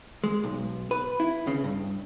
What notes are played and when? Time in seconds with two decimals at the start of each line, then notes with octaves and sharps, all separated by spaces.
0.24 G#3
0.43 B1
0.91 B4
1.20 E4
1.47 C#3
1.64 G2